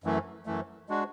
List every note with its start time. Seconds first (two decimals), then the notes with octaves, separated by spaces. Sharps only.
0.04 F#2 E3 A3
0.46 F#2 E3 A3
0.89 G#3 D4 F#4